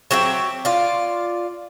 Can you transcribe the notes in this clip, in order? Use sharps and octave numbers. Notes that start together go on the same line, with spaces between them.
F#3 C4 G4 E5
F4 D5